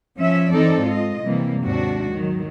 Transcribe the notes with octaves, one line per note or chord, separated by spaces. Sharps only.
F3 C#4 E5
E3 C4 D#4 A4 D5
G#2 F4 D#5
C3 E3 G3 A#3
D#2 G#2 C3 D4 F#4
D#3 F#3